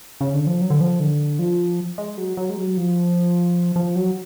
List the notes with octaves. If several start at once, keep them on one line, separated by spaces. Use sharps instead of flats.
C#3
D3
F3
F#3
D3
F3
D3
F3
G#3
F#3
F#3
G#3
F#3
F3
F3
F#3